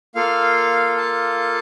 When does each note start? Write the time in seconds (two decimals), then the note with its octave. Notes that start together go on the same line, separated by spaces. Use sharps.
0.15 A#3 F4 A4 F5
0.97 A5